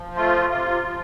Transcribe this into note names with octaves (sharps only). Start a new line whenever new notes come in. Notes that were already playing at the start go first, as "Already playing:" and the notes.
Already playing: F3
A3 F4
C3 F4
F3